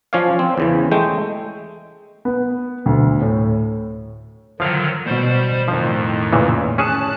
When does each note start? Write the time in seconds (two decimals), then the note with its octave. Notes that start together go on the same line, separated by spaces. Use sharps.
0.13 F3 C#4 C#5 D5 F5
0.39 C4
0.58 E2 C#3 E3
0.92 G#3 A3 G5
2.25 B3
2.86 D2
3.21 A2
4.60 D3 D#3 F3 F#3 F5
5.05 B2 G3 C5
5.68 F2 A2 D#3 F3
6.33 A#2 C#3 E3
6.78 C#4 G#4 A5 F#6